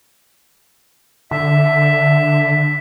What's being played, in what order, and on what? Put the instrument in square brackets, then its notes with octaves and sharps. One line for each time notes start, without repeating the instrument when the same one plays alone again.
[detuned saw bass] D3 [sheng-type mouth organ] E5